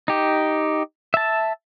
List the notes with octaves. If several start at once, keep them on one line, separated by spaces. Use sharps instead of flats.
D#4 G4
E5 A5